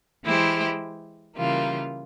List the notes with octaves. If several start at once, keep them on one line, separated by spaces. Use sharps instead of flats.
E3 G#3 E4 G4 C5
C#3 E3 G3 A#3 F4